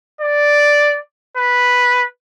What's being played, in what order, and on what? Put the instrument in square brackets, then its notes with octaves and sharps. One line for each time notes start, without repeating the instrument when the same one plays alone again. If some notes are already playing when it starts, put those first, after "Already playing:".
[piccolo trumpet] D5
B4